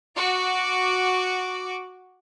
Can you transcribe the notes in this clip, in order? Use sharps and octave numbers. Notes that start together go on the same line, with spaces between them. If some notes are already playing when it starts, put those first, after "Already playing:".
F#4 D6